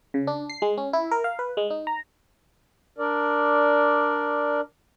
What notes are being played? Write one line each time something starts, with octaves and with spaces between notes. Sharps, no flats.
C#3
D4
C7
G#3
C#4
E4
A#4
F5
B4
G#3
D#4
A#5
D4 A#4 D5